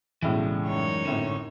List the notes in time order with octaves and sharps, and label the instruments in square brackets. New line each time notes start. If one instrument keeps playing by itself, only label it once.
[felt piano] B1 A2 C#3 [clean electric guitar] E3 G3 G#3
[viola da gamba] F#2 D#4 C#5
[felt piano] G#1 A2 C#4 [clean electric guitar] D3